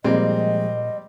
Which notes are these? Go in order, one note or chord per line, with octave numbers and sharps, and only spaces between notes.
A#2 F3 G3 G#3 A#3 C4 D#5